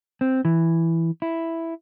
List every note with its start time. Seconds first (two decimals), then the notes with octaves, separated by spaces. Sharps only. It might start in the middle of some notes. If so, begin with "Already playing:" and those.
0.21 C4
0.45 E3
1.22 E4